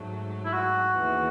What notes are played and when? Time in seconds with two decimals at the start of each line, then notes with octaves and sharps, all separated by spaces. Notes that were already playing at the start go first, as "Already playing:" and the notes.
Already playing: G#2 F#3 A3
0.45 E4
0.53 F#4
0.98 D#2 C#3 E3 B3